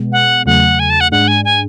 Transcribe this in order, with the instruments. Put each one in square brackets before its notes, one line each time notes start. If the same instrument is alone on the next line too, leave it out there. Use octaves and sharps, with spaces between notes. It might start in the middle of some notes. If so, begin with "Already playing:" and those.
Already playing: [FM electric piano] B2 G#3 B3
[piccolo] F#5
[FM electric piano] E2 C#3 F#3 A3 [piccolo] F#5
[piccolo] G#5
A5
F#5
[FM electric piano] G#2 G#3 D4 [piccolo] F#5
[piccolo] G#5
G#5